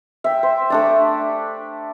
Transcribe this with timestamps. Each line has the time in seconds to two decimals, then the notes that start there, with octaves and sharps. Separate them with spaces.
0.24 E5 G5
0.43 C5
0.70 A3 D4 D5